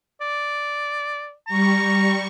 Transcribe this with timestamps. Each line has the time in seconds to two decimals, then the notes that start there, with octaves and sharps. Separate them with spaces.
0.21 D5
1.47 G3 A#5 C#6